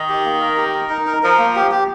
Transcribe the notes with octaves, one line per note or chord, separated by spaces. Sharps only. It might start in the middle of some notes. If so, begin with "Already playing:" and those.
Already playing: D#3
G4
A#3
A#4
G4
A#4
D#4
A#4
F3 A#4
A#3
G4
G4